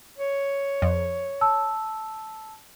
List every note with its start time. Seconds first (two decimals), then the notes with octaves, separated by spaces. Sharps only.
0.18 C#5
0.82 F2
1.41 A5 E6